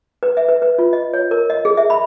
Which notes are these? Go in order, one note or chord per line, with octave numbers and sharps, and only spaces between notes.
B4
E5
B4
B4
F4
D#5
C#5
A#4
D#5
G#4
E5
B5